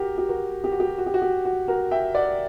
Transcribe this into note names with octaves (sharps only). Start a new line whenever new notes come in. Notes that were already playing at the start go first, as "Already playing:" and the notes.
Already playing: F#4 G4 A#4
G4
F#4 A#4
G4
F#4
G4
F#4
G4
F#4
G4
F#4
F#4 A#4
E5 G5
D5 F#5